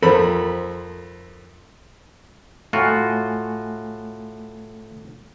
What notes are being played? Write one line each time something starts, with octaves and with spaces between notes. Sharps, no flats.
F2 A4 A#4 C5 B5
A2 A3 F4 F#4 G#5